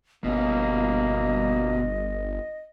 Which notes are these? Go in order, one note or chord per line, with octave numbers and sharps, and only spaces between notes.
G1 B2 A#3 C#4 D#5